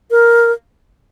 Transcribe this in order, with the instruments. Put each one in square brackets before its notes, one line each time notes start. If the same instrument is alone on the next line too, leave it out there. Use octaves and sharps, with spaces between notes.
[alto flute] A#4